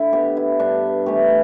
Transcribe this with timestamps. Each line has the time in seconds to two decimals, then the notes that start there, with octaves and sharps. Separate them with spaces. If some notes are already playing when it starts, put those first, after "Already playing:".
Already playing: D3 E4
0.13 B3 G4
0.37 E4
0.59 G2 D4
1.06 E3 A3 G4